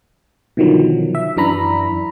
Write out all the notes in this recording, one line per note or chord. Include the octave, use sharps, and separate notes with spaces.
B2 D3 D#3 F3 F#3
E5
F#2 E3 D4 A#5 B5